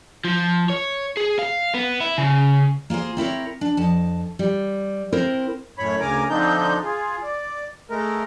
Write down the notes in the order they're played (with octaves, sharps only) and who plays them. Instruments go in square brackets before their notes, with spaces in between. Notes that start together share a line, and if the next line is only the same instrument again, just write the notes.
[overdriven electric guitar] F3
C#5
G#4
F5
B3
E4
C#3
[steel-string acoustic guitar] A#3 F4 G#4 C5
C4 E4 A#4 C#5
D4
F2 A5
G3
C4 E4 A#4 C5
[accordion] F#2 A2 C#5 B5
D2 C#3 A#4 G#5 A#5 D6
D3 F3 C4 D4 D#4 G6
F4 G#4
D5
G#3 A3 A#4